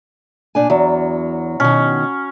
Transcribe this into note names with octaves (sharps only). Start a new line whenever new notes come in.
A#2 D4 G#5
E2 F#3
B2 D#3 C#4